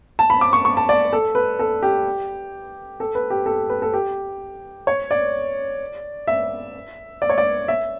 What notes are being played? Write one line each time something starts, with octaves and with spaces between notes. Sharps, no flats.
A5
B5
D6
C#6
C#6
A5
D5
A4
B4
A4
G4
A4
B4
G4
A4
B4
A4
G4
C#5
D5
E5
D5
C#5
D5
E5